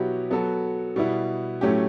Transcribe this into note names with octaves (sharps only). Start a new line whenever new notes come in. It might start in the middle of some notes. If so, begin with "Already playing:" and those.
Already playing: B2 F#3 B3 E4 G4
F#3 B3 F#4 A4
B2 G3 B3 E4
A2 F#3 A3 C#4 G4